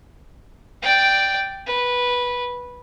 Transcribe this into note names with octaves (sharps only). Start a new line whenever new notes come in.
D5 G5
B4